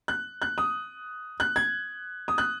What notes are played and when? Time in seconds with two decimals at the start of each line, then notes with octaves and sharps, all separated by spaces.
0.08 F#6
0.42 F#6
0.58 D#6
1.40 F#6
1.56 G#6
2.28 D#6
2.38 F#6